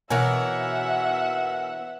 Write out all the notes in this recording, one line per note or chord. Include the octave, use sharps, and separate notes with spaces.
B2 E3 A#4 C#5 E5 F#5 G#5